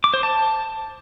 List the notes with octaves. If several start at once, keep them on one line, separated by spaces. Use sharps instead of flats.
D6
C5
A5